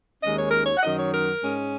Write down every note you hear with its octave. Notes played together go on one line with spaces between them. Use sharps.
D#2 D#3 G#3 C#4 D#5
C#5
A#4
C#5
F#5
F#2 D#3 F#3 D#5
C#5
A#4
G#2 G#3 C#4